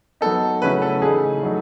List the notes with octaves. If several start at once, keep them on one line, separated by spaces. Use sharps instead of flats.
F#3 B3 D#4 A4
C#3 F#3 A3 C#4 E4 B4
A4
C#3 E3 A3 D#4 G#4
F#3 A3 D#4